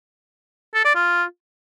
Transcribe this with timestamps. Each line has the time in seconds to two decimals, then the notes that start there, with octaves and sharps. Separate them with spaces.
0.74 A4
0.85 D5
0.95 F4